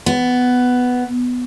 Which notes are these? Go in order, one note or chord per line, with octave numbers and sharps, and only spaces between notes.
B3